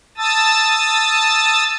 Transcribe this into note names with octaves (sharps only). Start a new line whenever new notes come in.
A5 D#6 E6 A6